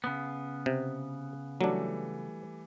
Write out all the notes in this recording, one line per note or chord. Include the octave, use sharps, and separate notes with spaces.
C#3 B3
C3
E3 F#3 G3 A3 D4